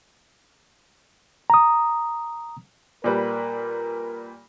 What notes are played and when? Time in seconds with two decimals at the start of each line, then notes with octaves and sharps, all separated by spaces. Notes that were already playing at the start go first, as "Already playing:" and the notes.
1.50 A#5 D#6
3.04 A#2 G3 A#4 B4